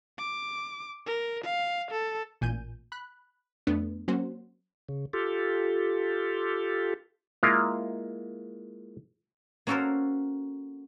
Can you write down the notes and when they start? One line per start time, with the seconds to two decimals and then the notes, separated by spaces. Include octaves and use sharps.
0.19 D6
1.06 A#4
1.44 F5
1.91 A4
2.41 A1 A#2 G#5 G6 D#7
2.92 B5 F#6
3.67 F2 A3 B3 D4
4.08 F#3 A#3 C4 C#4 F#4 C5
4.89 C#3
5.13 F4 G4 A4
7.43 G#3 A#3 E4 F4 A#5
9.67 A#3 C#4 F#4 A4 A#4 C5